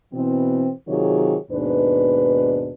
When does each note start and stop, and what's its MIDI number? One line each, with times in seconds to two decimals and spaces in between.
0.14 0.71 47
0.14 0.71 52
0.14 0.71 60
0.88 1.36 48
0.88 1.36 51
0.88 1.36 54
0.88 1.36 65
0.88 1.36 68
0.88 1.36 73
1.52 2.74 39
1.52 2.74 44
1.52 2.74 47
1.52 2.74 62
1.52 2.74 71